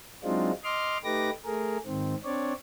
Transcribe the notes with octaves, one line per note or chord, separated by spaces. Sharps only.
F#3 G#3 C4 D4 D#4 F4
D#5 C6 D6 F6
A3 D#4 G4 B4 D6 A#6
A3 G#4 A#4
G#2 D#3 C4
C4 D4 C#5 D5